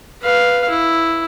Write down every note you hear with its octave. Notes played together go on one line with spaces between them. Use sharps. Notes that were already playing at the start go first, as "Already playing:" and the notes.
B4 F5
E4